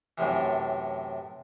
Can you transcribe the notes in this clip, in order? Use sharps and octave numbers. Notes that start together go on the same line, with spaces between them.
F#2 A2 C3 E3